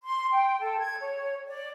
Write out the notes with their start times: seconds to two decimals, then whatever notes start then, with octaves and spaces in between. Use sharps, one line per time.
0.04 C6
0.32 G5
0.61 A4
0.80 G#6
0.99 C#5
1.48 D5